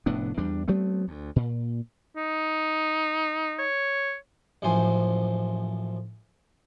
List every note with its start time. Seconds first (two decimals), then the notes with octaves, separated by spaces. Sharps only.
0.06 F1 A2 B3 D4
0.38 E2 G3 D4
0.68 F#3 A3 B3 C4
1.08 D2
1.36 A#2
2.16 D#4
3.59 C#5
4.62 A1 F#2 A2 F3 C5 G#5